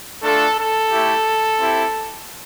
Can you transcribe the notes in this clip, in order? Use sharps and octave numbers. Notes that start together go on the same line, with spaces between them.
A3 D4 F4 A4
A4
A3 E4 G4
C4 E4 G4